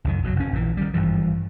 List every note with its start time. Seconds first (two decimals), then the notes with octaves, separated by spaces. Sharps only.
0.04 C#2 F#2 D#3
0.23 B1 B2 D#3 F#3
0.36 F1 C#4
0.53 A#1 A#2 E3
0.77 D#3 G3
0.94 G#1 G2 E3 F3